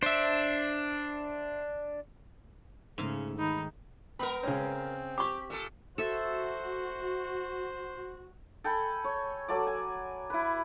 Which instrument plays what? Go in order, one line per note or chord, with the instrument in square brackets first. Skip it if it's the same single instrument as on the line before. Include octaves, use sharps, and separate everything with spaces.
[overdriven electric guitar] D4 [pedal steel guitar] C5 E5
[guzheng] G#2 F5 [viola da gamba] C#3 A3
[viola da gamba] D#3 [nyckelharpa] D#4 [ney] B5
[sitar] B3 A#4 [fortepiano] B5
[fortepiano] C#3 C#4 [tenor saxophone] C4
[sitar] G4 [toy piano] C#6 D6
[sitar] A#2 A4
[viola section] F#4 [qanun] A4 E5 [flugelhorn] C5
[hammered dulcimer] A4 G5 G#5 B5
C#5
F#3 A4 D5 D6
G#5
E4 B4